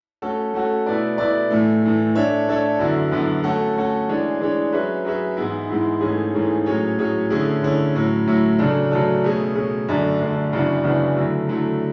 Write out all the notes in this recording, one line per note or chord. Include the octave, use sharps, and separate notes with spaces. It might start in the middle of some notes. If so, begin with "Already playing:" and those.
A3 C#4 F#4 A4
A3 C#4 F#4 A4
B2 A3 E4 B4 D5
B2 A3 E4 B4 D5
A2 E3 A3
A2 E3 A3
A3 D4 A4 C#5 E5
A3 D4 A4 C#5 E5
F#2 D3 F#3 B3 E4
F#2 D3 F#3 B3 E4
A3 C#4 F#4 A4
A3 C#4 F#4 A4
E3 G#3 D4 G#4 C#5
E3 G#3 D4 G#4 C#5
F#3 C#4 G#4 B4 E5
F#3 C#4 G#4 B4 E5
G#2 E3 G#3 B3 E4
G#2 E3 G#3 B3 E4
G#2 E3 A3 C#4 G#4
G#2 E3 A3 C#4 G#4
A2 F#3 C#4 G#4 C#5
A2 F#3 C#4 G#4 C#5
D3 A3 C#4 E4 G#4
D3 A3 C#4 E4 G#4
A2 F#3 C#4 E4
A2 F#3 C#4 E4
C#3 F#3 A3 D4 A4
C#3 F#3 A3 D4 A4
B2 A3 C#4 G#4
B2 A3 C#4 G#4
F#2 D3 A3 D4
F#2 D3 A3 D4
F#2 C#3 E3 B3 D4
F#2 C#3 E3 B3 D4
D3 F#3 A3 E4
D3 F#3 A3 E4